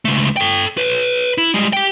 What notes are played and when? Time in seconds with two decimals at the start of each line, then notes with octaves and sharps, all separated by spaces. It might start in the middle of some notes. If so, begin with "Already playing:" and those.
0.05 C#2 A3
0.37 A4 G5
0.78 B4 C#5
1.38 E4
1.54 G3 G#3
1.73 G4 G5